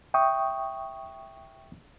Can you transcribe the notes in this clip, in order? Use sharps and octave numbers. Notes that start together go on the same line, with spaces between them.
E5 G5 C#6 D#6